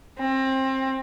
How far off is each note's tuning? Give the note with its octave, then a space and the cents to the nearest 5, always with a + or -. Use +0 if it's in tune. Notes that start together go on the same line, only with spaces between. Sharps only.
C4 +25